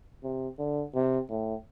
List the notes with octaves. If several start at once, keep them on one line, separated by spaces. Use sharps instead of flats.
C3
D3
C3
A2